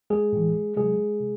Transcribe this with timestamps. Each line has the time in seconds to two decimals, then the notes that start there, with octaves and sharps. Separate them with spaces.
0.10 G#3 G#4
0.33 A2 E3
0.77 C3 F#3 G#3 G#4
1.21 C3